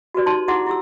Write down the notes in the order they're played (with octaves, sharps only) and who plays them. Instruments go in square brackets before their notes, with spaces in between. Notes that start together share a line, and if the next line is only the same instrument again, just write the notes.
[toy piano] F#4 G4 B4 D5
D#4 D5 A5 C6
D#4 E4 G#4 F#5 C6 D6
E4 G4 E6